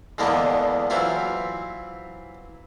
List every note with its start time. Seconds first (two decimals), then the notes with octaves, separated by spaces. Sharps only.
0.18 E2 D3 G#3 A#3 B3 D4
0.90 E3 F#3 C4 E4 F4